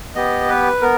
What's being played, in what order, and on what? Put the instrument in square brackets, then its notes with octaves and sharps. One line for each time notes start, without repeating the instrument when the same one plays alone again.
[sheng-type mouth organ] B3 G4 D#5
B4
B3 A#4